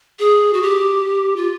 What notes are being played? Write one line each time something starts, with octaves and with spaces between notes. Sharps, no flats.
G#4
F#4
G4
F4